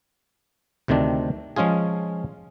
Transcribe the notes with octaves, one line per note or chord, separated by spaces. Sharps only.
D2 C3 D#3 C4 D4
F3 G#3 C#4 F4 G#4